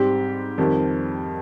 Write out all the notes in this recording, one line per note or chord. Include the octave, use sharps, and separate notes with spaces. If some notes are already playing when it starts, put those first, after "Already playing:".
Already playing: G#2 G3 C4 G4
F2 D#3 G3